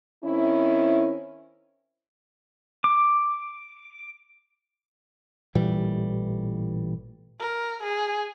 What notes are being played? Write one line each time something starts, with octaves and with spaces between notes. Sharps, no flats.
D#3 C4 C#4 E4
D6
A1 A#2 E3 G3
A#4
G#4